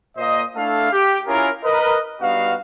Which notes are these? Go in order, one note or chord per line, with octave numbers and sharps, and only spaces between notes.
A#2 A#3 C5 D#5
A3 D4 E4 A4 F5
G4
C#4 E4 F4 G#4 A#4
A#4 B4 D#5
G2 B3 D#4 F#4 F5